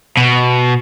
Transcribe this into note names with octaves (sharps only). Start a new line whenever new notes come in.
B2